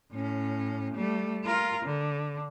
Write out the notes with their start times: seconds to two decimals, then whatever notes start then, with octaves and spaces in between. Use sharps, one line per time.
0.12 A2 C#4
0.95 G3 A3
1.45 F4 A#4
1.86 D3